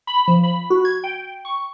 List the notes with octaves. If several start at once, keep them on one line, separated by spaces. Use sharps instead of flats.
B5
F3
B5
F#4
G#6
G5
C#6